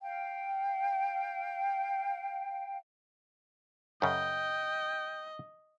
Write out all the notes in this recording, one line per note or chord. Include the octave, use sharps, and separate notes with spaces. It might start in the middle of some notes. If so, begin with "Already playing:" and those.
F5 G5
F#2 C#3 D#5 G5